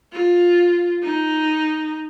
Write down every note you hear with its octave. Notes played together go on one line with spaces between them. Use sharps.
F4
D#4